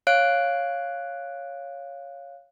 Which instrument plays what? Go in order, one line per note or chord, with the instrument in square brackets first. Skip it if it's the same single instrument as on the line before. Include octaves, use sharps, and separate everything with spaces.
[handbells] C#5 F5 F#6 D7